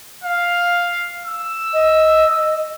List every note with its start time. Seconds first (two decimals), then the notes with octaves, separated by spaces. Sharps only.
0.24 F5
1.26 E6
1.73 D#5